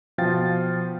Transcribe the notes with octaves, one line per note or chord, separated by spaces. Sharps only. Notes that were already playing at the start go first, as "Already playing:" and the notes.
B2 F3 F5 G5 A6